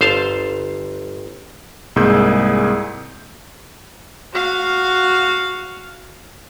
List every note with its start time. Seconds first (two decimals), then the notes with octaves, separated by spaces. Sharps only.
0.01 G1 C5 F5 A5
1.96 C2 G#2 A#3 G#4 E6 G6
4.33 F#4 F5